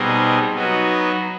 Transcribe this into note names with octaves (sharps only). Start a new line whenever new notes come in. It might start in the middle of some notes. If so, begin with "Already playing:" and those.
Already playing: B2 G3 C4 D#4 G#4
F#3 B3 D#4 F#4